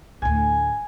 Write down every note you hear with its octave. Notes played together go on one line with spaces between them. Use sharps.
D2 A2 G#5